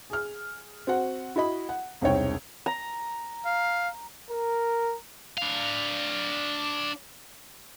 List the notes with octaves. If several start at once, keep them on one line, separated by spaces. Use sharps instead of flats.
G#4 F6
C4 F#4 F#5
E4 F#4 D#5 B5
F#5
E1 C2 C4 D#4 C#5 G5
A#5
F5
A#4
D4 F5